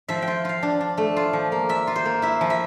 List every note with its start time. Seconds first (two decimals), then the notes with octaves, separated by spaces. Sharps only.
0.08 F3 E5
0.22 G5
0.27 F4
0.45 F4 F5
0.63 D4
0.81 D4
0.97 A3
1.16 F4
1.33 F3
1.52 A#3
1.69 F4 E5
1.87 F4
1.96 C5
2.05 A#3
2.22 E4 E5
2.41 F3
2.50 E5